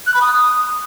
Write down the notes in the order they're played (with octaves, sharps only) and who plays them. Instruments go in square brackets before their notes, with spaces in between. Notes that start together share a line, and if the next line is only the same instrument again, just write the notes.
[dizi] F#6
B5
D#6